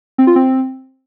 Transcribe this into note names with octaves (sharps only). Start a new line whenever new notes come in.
C4
F4
C4